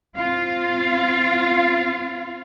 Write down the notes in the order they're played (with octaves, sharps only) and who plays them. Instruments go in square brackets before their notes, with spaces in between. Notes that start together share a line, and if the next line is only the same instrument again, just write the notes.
[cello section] C4 F4 F5